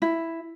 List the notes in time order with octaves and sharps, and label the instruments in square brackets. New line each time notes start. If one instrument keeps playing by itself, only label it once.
[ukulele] E4